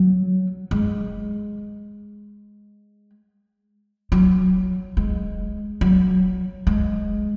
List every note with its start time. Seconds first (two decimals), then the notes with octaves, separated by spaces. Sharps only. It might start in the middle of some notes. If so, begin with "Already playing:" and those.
Already playing: F#3
0.71 G#3
4.12 F#3
4.97 G#3
5.81 F#3
6.67 G#3